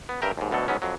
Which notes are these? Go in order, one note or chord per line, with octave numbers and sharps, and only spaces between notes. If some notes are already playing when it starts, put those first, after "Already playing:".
B3
G2 A#4 E5 G5 A#5
D#2 G#2
D2 B2 F#3 A4
G#2 F#3 B3 C#4
F2 F#3